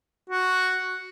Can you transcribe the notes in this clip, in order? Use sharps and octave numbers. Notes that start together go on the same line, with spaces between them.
F#4